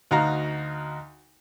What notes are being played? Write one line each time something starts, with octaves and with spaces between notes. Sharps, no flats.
D2 D#4 F#4 F5 A#5